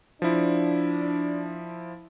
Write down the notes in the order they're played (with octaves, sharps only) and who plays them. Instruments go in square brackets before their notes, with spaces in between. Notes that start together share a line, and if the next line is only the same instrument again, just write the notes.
[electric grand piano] F3 E4 [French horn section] D4